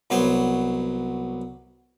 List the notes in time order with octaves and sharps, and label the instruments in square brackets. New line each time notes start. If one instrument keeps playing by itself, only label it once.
[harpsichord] C2 F#3 B3 C5 C#5